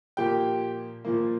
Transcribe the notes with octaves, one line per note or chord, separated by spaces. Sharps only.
A#2 F3 A#3 G4 G5
A#2 F3 A#3